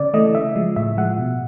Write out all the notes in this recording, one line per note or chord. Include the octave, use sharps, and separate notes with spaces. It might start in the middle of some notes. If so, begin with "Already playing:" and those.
Already playing: C#3 D5
E3 A3 D#5
C#3 E5
F3 G#3
A2 E5
F3 G#3 F#5
B2